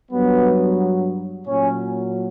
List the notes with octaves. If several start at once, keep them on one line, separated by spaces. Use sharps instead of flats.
G2 F#3 B3
A#2 F#3 C#4